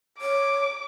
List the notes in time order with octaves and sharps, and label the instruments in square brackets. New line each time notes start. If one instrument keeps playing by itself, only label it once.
[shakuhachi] C#5 [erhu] D6